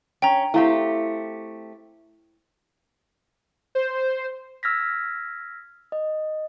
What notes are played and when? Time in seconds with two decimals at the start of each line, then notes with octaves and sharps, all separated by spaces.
0.22 C#4 G5 A#5
0.54 A3 C4 E4 G4 F5
3.75 C5
4.63 E6 F6 G#6 A#6 B6
5.92 D#5